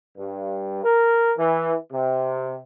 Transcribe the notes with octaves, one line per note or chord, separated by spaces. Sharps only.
G2
A#4
E3
C3